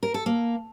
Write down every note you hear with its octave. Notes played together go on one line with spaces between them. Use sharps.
A#4
A4
A#3